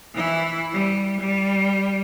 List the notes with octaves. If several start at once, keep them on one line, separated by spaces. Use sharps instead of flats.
E3 E4
G3
G3